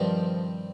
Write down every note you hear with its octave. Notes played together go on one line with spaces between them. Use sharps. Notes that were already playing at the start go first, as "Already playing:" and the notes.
Already playing: G2 D#3 F3 G3 C4